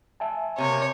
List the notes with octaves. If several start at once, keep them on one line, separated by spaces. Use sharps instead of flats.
E5 G#5 A5
C3 A#3 C#5